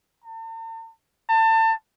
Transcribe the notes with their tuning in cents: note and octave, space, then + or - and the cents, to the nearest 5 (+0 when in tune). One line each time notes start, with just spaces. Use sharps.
A5 +45
A5 +30